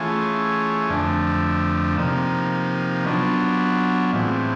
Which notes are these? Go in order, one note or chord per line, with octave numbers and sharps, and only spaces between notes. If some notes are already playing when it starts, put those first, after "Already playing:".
Already playing: E3 A3 C#4 F4 G#4
F2 D3 F3 A3 D4
C3 F3 A#3 D#4
F#3 B3 D4 F4
A2 E3 G#3 C4